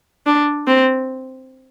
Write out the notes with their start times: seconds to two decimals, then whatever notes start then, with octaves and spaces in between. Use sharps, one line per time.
0.26 D4
0.67 C4